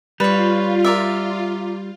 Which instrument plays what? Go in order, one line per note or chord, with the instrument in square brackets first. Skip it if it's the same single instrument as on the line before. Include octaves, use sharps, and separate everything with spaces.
[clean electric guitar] G3 [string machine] F4 [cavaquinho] B4 C#5
[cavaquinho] A#4 D5 E5